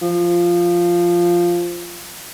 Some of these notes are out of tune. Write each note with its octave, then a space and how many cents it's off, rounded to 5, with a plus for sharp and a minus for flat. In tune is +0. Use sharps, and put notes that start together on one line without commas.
F3 -5